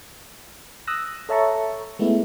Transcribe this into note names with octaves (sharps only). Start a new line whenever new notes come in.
D#6 E6 F#6 A#6
A4 C#5 E5 A5 A#5 C#6
G#3 A3 B3 E4